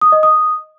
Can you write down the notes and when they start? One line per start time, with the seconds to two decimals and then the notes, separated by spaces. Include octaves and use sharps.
0.01 D#6
0.12 D#5
0.23 D#6